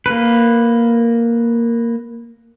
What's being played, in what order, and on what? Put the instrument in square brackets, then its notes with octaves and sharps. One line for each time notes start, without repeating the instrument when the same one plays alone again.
[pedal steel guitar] A#3 B4